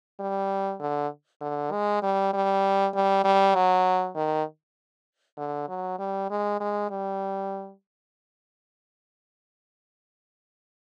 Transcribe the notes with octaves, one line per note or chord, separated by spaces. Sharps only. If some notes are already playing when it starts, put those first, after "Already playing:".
G3
D3
D3
G#3
G3
G3
G3
G3
F#3
D#3
D3
F#3
G3
G#3
G#3
G3